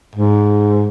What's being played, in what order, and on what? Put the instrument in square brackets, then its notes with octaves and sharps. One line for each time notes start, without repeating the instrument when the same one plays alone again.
[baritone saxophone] G#2